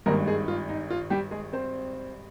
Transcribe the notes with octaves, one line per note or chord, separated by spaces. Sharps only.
G#1 G2 D#3 A#3 A#4
G#3 G#4
F4
D#4
F4
G3 G4
G#3 G#4
C4 C5